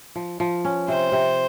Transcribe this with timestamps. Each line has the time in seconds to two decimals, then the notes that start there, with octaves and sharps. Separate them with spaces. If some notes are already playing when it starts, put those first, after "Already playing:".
0.16 F3
0.40 F3
0.65 C#4
0.88 C3 C5
1.12 C3